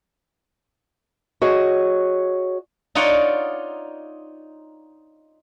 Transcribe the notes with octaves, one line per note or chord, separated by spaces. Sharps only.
F#4 G#4 C#5 D#5
D#4 F4 C#5 D5 F#5